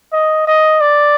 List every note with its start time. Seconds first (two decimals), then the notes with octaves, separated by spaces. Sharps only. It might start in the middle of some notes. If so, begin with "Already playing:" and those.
0.13 D#5
0.47 D#5
0.81 D5